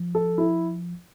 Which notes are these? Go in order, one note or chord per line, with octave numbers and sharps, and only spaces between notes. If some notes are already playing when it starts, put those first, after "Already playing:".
Already playing: F3
A4
E4